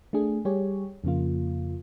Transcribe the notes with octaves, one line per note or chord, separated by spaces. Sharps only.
A3 D4 G#4
G3 G4 G#4 C#5
F2 C#3 A#3 F4